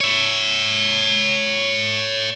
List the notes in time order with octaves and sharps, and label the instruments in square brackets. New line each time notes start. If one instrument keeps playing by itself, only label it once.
[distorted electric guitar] C#5 E5